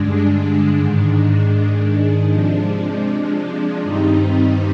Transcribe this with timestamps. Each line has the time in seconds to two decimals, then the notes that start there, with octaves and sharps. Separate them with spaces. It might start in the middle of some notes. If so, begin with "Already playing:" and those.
Already playing: G2 D3 G#3 D4
0.78 G#2 D#3 G#3 D4
2.30 C3 F3 G#3 D4
3.82 G2 D#3 G3 C4 D#4